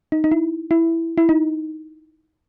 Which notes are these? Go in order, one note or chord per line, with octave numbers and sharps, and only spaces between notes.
D#4
D#4
E4
E4
E4
D#4